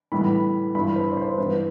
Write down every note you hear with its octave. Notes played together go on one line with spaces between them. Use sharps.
A2 E3 G3 B3 B5
G2 E3 B3 B5
C5
D5
C5
G2 E3 B3 B4